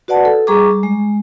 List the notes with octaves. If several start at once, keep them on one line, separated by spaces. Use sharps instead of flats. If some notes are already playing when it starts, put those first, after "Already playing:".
F#4 B4 D5 F#5 A5
A4
G3 G#4 A#5 C#6 D6
G3
G#3